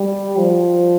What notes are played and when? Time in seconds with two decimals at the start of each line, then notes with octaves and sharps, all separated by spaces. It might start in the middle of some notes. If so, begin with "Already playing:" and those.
Already playing: G3
0.37 F3